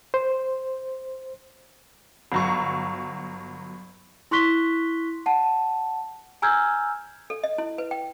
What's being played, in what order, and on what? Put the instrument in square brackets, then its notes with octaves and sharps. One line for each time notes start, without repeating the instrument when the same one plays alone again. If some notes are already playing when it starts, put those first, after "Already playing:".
[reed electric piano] C5
[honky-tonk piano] G1 F#3 C#6
[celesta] E4 C6 C#6 F#6 B6 G7
F#5 A5
G#5 A#5 E6 F6 G6 G#6
[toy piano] A4
D#5
E4
B4
G5